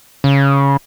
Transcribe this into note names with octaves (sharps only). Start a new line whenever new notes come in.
C#3